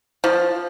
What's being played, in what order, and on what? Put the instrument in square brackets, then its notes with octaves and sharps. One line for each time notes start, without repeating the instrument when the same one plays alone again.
[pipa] F3